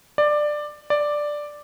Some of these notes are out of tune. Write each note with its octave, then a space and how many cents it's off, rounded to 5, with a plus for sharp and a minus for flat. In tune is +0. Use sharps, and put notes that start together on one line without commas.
D5 +15
D5 +5